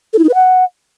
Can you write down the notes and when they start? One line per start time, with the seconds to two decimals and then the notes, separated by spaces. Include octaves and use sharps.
0.13 A4
0.19 E4
0.24 D#4
0.29 B4
0.34 F#5